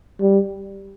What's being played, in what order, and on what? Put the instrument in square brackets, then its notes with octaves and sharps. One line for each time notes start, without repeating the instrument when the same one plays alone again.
[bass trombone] G3